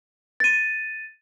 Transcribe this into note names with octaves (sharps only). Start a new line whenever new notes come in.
A6 D#7